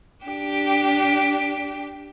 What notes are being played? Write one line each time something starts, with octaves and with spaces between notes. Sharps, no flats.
D4 G4